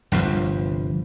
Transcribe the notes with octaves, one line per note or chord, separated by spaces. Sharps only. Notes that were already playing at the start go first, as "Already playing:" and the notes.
G1 C2 G2 F3